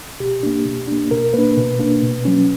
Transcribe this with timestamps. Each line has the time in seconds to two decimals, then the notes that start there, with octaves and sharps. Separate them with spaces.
0.20 B2 G4
0.43 A#3 D4
0.65 B2
0.88 A#3 D4
1.11 B2 A#4
1.34 A#3 D4 B4
1.57 B2
1.79 A#3 D4
2.02 B2
2.25 F#3 C#4